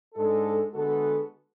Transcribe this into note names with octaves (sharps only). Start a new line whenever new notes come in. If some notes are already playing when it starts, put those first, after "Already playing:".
G#2 G#3 D4 A4
D3 G#3 B3 F#4 A4